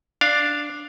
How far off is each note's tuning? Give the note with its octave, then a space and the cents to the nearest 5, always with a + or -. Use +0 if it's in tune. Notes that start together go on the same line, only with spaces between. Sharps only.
D4 +0 F5 +0